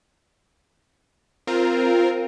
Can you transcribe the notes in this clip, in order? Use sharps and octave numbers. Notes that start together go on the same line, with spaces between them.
C4 F4 A#4